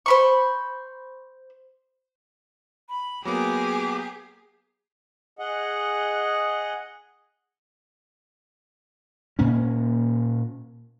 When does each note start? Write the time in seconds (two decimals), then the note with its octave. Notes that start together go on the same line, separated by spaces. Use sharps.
0.06 C5 B5 C#6
2.89 B5
3.25 F#3 A#3 B3 G4 G#4 D6
5.39 G#4 D#5 F#5
9.39 A#2 A#3 C#4